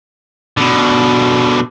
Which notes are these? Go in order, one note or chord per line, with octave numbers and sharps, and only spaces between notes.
B2 D3